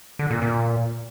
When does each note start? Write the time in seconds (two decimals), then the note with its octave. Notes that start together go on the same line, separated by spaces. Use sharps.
0.19 D3
0.31 A#2
0.42 A#2